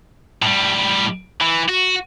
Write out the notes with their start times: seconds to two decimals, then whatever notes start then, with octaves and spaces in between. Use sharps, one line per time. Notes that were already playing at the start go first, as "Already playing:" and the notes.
0.42 A2 G3
1.42 E3
1.69 F#4